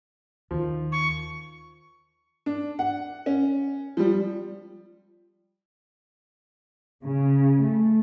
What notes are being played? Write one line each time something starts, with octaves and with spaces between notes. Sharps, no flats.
D#2 D#3 F3
C#6
D4
F#5
C#4
F3 G3
C#3
A3